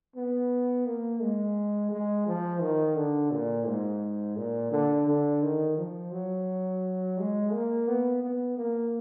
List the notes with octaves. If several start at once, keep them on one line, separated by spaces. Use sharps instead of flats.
B3
A#3
G#3
G#3
F3
D#3
D3
A#2
G#2
A#2
D3
D3
D#3
F3
F#3
G#3
A#3
B3
B3
A#3